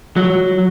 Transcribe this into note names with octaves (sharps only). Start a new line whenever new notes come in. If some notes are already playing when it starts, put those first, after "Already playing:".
F#3